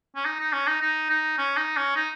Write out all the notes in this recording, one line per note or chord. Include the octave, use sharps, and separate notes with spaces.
C#4
D#4
D#4
C#4
D#4
D#4
D#4
C#4
D#4
C#4
D#4